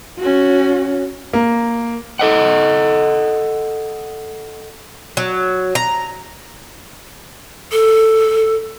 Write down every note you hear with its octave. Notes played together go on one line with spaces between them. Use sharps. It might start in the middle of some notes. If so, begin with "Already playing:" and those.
C#4 F#4
A#3
A4 D#5 F#5
F#3
A#5
A4